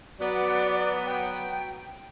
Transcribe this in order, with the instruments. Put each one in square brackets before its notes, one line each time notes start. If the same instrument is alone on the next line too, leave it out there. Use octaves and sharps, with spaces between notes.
[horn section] F#3 B3 [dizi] D5
[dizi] G5